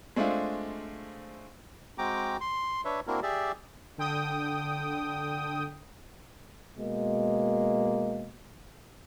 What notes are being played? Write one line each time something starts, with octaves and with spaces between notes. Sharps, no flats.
G#3 A3 C4 D4 F4
G#3 C4 F#4 G5 A#5 D6
C6
D4 B4 C#5 E5
A#3 C4 D4 E4 F#4 A#4
G4 G#4 D5 E5
D3 G5 D#6
B2 G#3 A#3